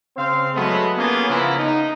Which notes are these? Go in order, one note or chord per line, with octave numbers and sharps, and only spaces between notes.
C#3 C4 C5 F5
F#3 G#3 A3 B3
A#3 B3 C#4 F4 G#4
C#3 F3 B3 E4 A#4
D#4